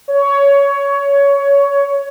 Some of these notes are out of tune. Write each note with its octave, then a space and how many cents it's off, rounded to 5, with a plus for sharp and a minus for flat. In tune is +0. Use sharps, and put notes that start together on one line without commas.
C#5 +15